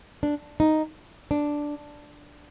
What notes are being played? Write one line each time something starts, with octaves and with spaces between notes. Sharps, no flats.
D4
D#4
D4